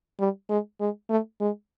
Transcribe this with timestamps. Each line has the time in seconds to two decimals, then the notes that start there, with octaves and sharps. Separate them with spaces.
0.20 G3
0.49 G#3
0.80 G#3
1.10 A3
1.41 G#3